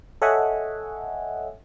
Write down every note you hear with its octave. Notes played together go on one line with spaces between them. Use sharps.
A4 C#5 D#5 E5 F#5 G#5